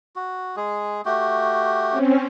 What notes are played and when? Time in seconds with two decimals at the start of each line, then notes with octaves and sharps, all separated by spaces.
0.16 F#4
0.56 G#3 G#4
1.06 A3 F#4 G4
1.91 C4 C#4